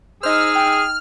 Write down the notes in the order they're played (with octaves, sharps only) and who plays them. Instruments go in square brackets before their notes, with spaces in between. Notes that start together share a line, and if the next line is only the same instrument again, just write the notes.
[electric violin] D#4 E6 [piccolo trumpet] G#4 [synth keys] C5 D#5 [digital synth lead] F6
[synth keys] G5